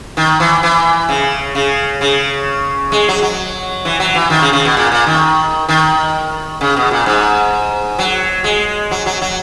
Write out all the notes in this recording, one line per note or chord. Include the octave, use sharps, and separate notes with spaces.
D#3
E3
E3
C#3
C#3
C#3
G#3
F#3
F#3
E3
F#3
E3
D#3
C#3
C#3
B2
A#2
A#2
D#3
D#3
C#3
B2
A#2
G#2
F#3
G#3
F#3
F#3
F#3